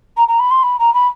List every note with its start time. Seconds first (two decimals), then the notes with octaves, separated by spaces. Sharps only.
0.17 A#5
0.28 A#5
0.39 B5
0.51 C6
0.63 B5
0.79 A#5
0.93 B5